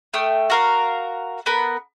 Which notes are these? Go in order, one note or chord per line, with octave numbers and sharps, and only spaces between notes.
A3 G5 D#6 F6
F#4 A#4 F5
B3 A#4 B5